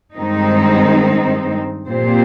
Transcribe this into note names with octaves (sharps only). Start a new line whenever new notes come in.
G2 D#3 G#3 C4 D#4
A#2 F3 C4 G4 C5